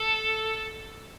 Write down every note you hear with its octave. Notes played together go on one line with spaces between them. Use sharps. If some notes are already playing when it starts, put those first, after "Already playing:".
Already playing: A4